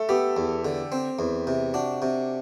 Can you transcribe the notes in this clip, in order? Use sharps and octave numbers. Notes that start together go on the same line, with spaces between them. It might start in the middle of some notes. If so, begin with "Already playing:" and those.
Already playing: A3 A4
B3 G4
E2
D3
C4
E2
C3
D4 F#4
C3